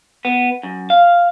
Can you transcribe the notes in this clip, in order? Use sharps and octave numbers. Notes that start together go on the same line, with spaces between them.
B3
F#2
F5